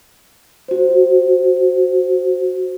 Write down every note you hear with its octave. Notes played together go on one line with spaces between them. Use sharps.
F#4 C5